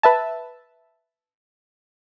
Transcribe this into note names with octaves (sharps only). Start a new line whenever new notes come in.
B4 E5 A5